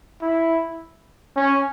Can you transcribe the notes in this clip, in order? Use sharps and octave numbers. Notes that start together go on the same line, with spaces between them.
E4
C#4